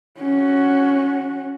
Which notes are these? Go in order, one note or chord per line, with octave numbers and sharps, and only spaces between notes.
C#4 F#4